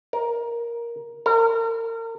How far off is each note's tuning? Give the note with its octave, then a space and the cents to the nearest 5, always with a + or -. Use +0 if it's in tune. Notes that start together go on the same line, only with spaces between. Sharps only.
A#4 +10
A#4 -35